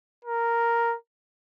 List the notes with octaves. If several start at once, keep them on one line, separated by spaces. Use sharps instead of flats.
A#4